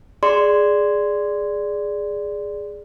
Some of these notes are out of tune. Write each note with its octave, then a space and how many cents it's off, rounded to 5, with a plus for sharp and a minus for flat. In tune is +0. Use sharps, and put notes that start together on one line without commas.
G#4 +0 D5 +0 C6 -10